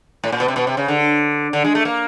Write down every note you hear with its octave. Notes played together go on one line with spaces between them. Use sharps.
A2
A#2
B2
C3
B2
C3
C#3
D3
D3
G#3
A3
A#3